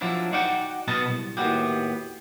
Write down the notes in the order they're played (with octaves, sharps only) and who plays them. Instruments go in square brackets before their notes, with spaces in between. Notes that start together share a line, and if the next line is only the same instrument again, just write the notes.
[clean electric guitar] F3 F#3 D4 E4
D#4 F#4 D5 F#5 G5
B1 B2 B3 F#4 D#5 A5
C2
D#2 A2 B3 D#4 F#4 G4